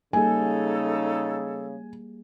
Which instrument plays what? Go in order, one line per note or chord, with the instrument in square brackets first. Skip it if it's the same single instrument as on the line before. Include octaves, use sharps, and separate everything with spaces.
[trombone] C#3 [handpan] G3 A#3 G#4 [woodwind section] D#4 A4 [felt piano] G#5